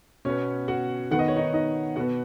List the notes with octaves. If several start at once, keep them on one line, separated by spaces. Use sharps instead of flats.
B2 B3 C#4 C#5
F#4 F#5
D#3 B3 F#5
D#5
C#5
D#4 D#5
D#4 D#5
B2 B3 F#4 F#5